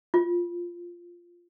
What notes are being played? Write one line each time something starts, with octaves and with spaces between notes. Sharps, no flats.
F4